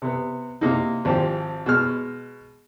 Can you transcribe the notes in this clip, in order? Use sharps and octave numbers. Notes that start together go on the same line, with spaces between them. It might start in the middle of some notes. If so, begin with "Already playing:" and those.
C3 B3
C3 A#3 D#4
G#1 F3 G4
B2 G#3 F6